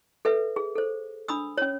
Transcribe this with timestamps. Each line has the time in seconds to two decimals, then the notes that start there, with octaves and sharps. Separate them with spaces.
0.25 A4 B4 E5
0.56 G#4
0.76 A4 C5
1.28 D4 B5 D#6 E6
1.58 C#4 C#5